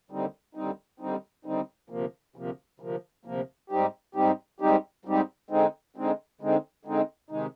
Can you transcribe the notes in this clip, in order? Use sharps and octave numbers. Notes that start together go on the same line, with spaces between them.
D#2 D3 G3 C4 D#4
D#2 D3 G3 C4 D#4
D#2 D3 G3 C4 D#4
D#2 D3 G3 C4 D#4
D2 C3 F3 A#3
D2 C3 F3 A#3
D2 C3 F3 A#3
D2 C3 F3 A#3
G#2 G3 C4 D#4 G4
G#2 G3 C4 D#4 G4
G#2 G3 C4 D#4 G4
G#2 G3 C4 D#4 G4
D3 G#3 C4 D#4
D3 G#3 C4 D#4
D3 G#3 C4 D#4
D3 G#3 C4 D#4
C3 D#3 G#3 D#4